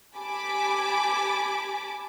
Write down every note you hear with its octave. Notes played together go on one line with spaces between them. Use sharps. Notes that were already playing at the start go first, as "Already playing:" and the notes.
G4 G#5 A5 B5 D6